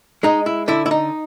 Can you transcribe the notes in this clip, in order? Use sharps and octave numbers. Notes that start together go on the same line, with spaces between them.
G#3 D#4
E4
D3 E4
E4
D#4